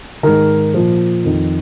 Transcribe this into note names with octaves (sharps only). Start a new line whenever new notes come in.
G#2 D#3 A#4
A#2 F3
F2 D#3